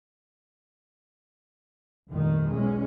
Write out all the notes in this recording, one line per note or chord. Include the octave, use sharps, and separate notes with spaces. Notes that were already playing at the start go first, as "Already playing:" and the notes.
F1 A#1 G2 D#3
B1 E2 G#3 C#4